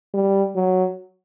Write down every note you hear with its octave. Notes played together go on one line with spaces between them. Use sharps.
G3
F#3